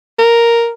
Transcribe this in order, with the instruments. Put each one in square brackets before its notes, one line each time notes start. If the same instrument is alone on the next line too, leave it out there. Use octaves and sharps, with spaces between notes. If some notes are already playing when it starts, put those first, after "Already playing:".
[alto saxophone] A#4